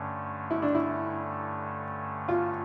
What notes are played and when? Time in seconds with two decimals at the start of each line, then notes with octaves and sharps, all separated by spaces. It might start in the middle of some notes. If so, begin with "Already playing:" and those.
Already playing: G2 D3 A3 C#4
0.51 E4
0.62 D4
0.75 E4
2.28 F4